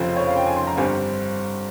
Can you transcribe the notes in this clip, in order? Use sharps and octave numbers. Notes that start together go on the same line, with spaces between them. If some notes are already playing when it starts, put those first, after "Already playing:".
Already playing: F1 F2 C#3 F3 C4 C5
C#5
F5
G5
G#5
C6
A#5
G1 G2 G3 C4 G#5